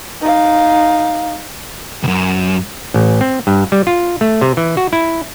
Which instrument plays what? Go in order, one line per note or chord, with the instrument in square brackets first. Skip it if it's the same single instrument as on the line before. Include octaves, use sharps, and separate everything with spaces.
[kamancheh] D#4 F5
[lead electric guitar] C#2 F#2
[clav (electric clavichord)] A1
C4
G2
G3
F4
A3
C3
E3
F#4
E4